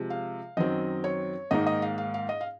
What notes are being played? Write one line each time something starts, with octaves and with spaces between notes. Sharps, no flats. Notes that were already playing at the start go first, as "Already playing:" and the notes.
Already playing: C3 F3 G#3
F5
F#2 D#3 F#3 C4 D#5
C#5
G#2 D#3 A#3 D#4 D#5
D#5
F5
F5
F5
D#5
F5